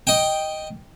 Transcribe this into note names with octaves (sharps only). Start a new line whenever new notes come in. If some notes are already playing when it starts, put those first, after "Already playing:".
D#5 G5